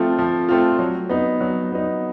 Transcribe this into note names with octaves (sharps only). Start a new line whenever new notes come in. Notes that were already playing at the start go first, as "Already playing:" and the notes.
Already playing: F3 A3 C4 F4
F3
A3 C4 F4
F#3
B3 D#4
F#3
B3 D#4